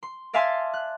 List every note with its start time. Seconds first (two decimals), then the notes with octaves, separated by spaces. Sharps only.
0.03 C6
0.33 D5 E5 F5 G#5 A5 C6
0.74 F#6